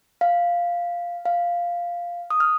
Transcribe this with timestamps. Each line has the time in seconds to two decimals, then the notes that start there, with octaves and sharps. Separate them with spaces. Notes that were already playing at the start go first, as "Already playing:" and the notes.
0.21 F5
1.25 F5
2.31 D#6
2.40 F6